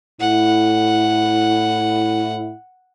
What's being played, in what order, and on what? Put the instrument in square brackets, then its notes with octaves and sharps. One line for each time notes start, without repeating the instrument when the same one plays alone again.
[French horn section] A2 E4 [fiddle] F#5